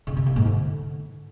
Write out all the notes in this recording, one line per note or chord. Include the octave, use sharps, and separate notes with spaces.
C#3
C3
A#3
G#2
D3